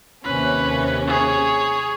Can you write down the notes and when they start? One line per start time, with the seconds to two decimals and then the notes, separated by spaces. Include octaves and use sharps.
0.24 D#2 C3 C#4 B4
1.07 G#4 C#5